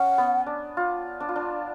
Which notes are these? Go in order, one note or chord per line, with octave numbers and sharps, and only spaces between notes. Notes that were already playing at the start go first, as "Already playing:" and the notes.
Already playing: C#4 F#5
B3
D4
F4
D4
F4
D4